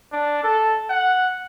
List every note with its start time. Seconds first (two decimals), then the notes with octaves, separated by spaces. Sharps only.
0.12 D4
0.44 A4
0.89 F#5